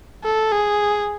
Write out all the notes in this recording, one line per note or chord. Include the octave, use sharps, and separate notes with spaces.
A4
G#4